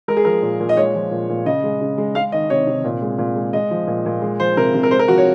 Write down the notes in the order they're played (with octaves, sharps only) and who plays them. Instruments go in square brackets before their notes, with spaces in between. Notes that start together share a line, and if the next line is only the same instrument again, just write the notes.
[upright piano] G#3 A#4
G#4
F3 A#4
A#2
A#2
D#5
G#3 C#5
F3
A#2
A#2
C#3 D#5
G#3
C#3
G#3
G#3 F5
D#3 D#5
C3 C#5
C3
A#2
G#3
A#2
G#3
G#3 D#5
F3
A#2
A#2
G#3
F3 C5
C3 A#4
C3
A#4
G#3 C5
A#4
F3 F#4
C#5